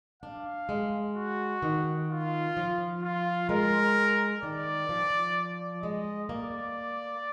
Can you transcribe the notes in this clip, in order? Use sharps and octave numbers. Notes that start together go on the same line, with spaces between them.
D4 F5
G#3
F#4
D#3
F4
F3
F4
G#3 A#4
D#3 D5
F3
G#3 D#5
A#3 D5